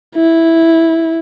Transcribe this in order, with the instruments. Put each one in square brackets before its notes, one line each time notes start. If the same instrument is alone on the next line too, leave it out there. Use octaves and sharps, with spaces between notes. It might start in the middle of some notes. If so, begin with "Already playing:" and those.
[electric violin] E4